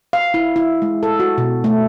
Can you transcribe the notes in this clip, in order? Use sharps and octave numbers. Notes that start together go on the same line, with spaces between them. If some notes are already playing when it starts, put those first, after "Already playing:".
F5
E4
E4
G#3
A4
F#4
B2
A3